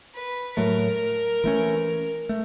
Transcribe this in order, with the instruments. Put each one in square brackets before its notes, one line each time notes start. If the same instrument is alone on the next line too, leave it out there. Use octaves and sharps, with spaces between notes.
[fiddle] B4
[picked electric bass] A2 F#3 A3 [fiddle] A#4
[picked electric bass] E3 A3 C#4
A3